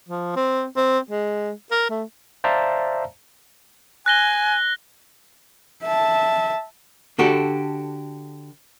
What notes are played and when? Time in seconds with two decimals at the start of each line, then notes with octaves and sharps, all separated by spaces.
0.09 F3
0.36 C4
0.77 C4
1.11 G#3
1.71 A#4
1.90 A3
2.44 C5 D5 E5 F5 A5 A#5
4.06 G#5 F#6 A#6 G7
5.83 E5 A5
7.19 D3 F#4 G4 A4